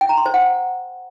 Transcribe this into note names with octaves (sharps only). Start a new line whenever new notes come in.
G5
A#5
C6
C5
F#5